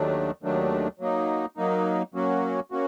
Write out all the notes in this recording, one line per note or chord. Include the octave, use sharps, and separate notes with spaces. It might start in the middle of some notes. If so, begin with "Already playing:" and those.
Already playing: D#2 D#3 F#3 A3 D4
D#2 D#3 F#3 A3 D4
F#3 A#3 D#4
F#3 A#3 D#4
F#3 A#3 C#4 F#4
A#3 C#4 F#4